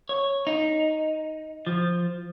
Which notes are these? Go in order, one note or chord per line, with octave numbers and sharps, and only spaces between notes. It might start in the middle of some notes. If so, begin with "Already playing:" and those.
C#5
D#4
F3